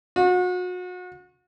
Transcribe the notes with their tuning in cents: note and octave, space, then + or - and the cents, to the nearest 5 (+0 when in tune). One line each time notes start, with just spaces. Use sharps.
F#4 -35